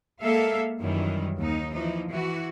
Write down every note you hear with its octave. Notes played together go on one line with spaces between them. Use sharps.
G#3 A#3 A4 E5 F5
F#2 D#3 E3 G3
D#2 D#4
E3 F3 D#4
E3 F#4